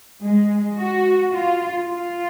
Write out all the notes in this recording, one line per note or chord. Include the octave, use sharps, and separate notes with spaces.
G#3
F#4
F4
F4